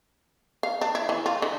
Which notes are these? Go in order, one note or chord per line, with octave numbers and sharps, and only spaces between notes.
F5
D4
E4
E3
F4
D3